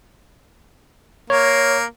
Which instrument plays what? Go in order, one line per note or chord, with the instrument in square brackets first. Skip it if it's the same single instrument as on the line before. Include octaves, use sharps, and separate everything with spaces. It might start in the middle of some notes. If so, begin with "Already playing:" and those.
[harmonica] A#3 [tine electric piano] C#5